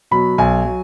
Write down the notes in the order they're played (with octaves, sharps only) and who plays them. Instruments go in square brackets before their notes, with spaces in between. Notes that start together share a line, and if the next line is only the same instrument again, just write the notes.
[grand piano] B2 F#3 B5
B1 G#5
F#3